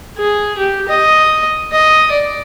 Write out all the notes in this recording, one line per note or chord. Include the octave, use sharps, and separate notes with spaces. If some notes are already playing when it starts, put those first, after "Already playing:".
G#4
G4
D#5
D#5
D5